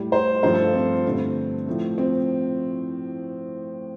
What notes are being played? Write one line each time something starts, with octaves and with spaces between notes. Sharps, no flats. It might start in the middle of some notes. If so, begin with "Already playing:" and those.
Already playing: A2 G3
C5
G2 F3 A3 C5
A4
F4
C4
G2 D3 A3
A2 F3 A3
C4